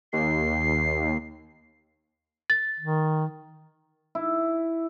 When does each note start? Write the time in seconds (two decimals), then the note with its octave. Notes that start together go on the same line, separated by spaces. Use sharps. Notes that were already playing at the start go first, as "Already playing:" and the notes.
0.13 D#2 C7
2.50 A6
2.80 D#3
4.15 E4